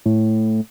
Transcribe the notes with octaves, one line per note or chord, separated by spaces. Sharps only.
A2